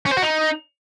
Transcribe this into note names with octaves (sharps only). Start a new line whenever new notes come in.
C#4
C5
F#4
D#4